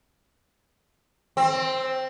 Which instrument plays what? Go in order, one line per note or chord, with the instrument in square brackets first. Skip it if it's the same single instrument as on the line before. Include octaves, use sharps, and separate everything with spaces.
[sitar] C4